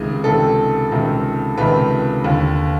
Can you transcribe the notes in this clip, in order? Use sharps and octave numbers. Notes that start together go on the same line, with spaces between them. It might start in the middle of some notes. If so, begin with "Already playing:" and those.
Already playing: C#2 C3 D#3 G#4
C#2 C3 D#3 A4
C#2 C3 D#3
C#2 C3 D#3 B4
D#2 D3